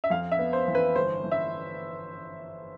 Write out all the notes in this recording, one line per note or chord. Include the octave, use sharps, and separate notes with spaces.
E5
F2 F5
E5
B3
C5
E3
B4
G1 C5
E3
E5